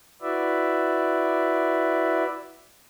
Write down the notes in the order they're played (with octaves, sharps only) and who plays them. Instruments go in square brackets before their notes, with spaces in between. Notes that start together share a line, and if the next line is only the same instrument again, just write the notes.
[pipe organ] E4 F#4 B4 D5 E5